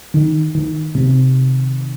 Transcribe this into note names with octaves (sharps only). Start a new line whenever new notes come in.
D#3
D#3
C3